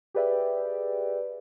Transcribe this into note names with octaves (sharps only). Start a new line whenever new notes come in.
G4 G#4 B4 D5 E5 G5